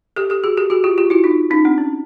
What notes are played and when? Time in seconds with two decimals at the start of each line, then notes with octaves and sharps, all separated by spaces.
0.16 G4 A4
0.30 G4 A4
0.44 F#4 G#4
0.57 G4 A4
0.70 F#4 G#4
0.84 F4 G4
0.98 F4 G4
1.10 E4 F#4
1.24 D#4 F4
1.50 C#4 D#4
1.65 C4 D4
1.78 C#4